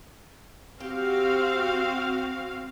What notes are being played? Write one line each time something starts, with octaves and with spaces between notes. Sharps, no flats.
C4 F#4 G4 F5